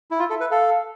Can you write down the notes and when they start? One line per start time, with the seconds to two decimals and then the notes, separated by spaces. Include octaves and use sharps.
0.11 E4
0.19 F4 E5
0.30 A4
0.41 B4
0.51 A4 F5